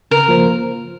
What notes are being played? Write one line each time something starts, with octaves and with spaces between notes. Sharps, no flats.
C#3 A#4
F3 A#3 F4 C5